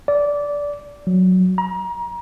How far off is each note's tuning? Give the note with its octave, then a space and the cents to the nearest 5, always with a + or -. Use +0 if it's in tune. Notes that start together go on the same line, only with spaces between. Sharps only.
D5 -15
F#3 -5
A#5 +30